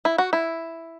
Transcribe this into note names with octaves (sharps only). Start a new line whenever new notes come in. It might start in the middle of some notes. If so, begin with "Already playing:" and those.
E4
F#4
E4